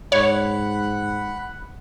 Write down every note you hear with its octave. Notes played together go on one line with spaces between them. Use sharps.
G#2 C#5 F#5 B5